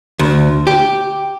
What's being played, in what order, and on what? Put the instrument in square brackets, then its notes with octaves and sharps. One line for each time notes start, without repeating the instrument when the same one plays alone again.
[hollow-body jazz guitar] D2
G4